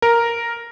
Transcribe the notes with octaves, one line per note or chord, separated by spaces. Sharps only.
A#4